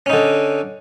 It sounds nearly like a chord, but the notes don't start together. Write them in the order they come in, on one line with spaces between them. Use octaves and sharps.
C#4 D#4 D3